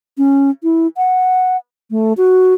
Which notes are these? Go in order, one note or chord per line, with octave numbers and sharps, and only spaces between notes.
C#4
E4
F#5
A3
F#4